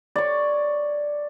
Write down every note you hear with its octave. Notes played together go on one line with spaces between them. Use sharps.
C#5 D5